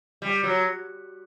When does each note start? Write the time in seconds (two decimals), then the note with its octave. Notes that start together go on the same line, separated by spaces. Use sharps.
0.22 G3
0.43 F#3